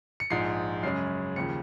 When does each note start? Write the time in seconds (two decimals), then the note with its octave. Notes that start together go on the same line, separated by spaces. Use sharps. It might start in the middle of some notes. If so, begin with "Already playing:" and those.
0.20 C#7
0.30 A#1 G#2 F3 C7
0.83 F#2 C#3 G#3 C#4 C7
1.36 D#2 C#3 F3 C#7